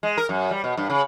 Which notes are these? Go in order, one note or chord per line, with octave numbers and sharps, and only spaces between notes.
G#3
A#4
F#2
G3
B2
G2
C#3